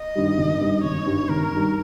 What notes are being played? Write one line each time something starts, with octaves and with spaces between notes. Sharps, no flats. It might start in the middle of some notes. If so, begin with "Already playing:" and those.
Already playing: D#5
G2 D#3 G3
G#1
G2 D#3 G3
G#1 C#5
G2 D#3 G3
G#1 A#4
G2 D#3 G3